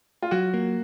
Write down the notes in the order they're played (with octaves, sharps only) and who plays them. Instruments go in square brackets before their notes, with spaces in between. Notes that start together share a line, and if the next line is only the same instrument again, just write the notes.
[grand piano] F4
[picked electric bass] F#3 [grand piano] F#4
[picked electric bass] A#3